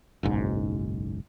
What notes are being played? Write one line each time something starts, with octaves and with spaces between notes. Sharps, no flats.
F#1 B1 G#2